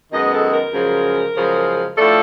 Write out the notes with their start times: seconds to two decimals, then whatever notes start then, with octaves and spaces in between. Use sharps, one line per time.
0.10 F#2 D#3 G#3 B3 D#5
0.31 A4
0.52 A#4
0.72 F#2 C#3 F3 G#3
1.35 F#2 C#3 F3 G#3
1.96 A2 F3 A3 D4 A4